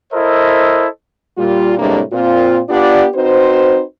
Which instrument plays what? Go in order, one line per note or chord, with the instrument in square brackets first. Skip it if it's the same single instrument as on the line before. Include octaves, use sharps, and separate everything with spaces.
[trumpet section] E4 A4 A#4 C5 D#5
[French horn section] A#2 G3 F4
A2 C3 G3 G#3 A#3 D4
A#2 C4 F4
B3 D4 F4 G4 D5
C4 D#4 F#4 B4 C5